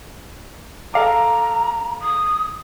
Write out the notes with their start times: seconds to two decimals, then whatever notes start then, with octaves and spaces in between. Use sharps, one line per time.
0.94 A4 F5 A#5 D6
2.02 D#6